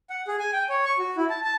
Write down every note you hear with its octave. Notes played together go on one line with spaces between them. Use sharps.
F#5
G#4
G#5
G5
C#5
C#6
F#4
E4
A5
A5